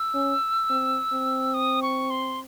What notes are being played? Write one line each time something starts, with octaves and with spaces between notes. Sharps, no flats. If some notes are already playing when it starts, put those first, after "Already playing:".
Already playing: E6
C#4
C4
C4
D#6
C#6
C6